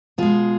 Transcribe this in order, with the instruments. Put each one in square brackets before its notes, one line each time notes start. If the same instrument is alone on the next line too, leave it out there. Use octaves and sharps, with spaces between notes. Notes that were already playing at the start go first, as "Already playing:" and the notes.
[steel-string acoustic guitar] B2 G#3 F4 G#4